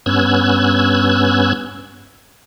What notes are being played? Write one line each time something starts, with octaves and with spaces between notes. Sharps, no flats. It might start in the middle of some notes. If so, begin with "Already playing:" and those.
G2 B3 C#4 E6 F#6 G#6